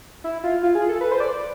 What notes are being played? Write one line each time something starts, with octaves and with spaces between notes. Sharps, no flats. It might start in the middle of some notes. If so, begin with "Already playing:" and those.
E4
F4
F4
G#4
A4
B4
C5
D5